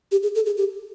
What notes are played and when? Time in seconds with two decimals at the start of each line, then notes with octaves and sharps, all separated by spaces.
0.11 G4
0.23 G#4
0.35 A4
0.46 G#4
0.57 G4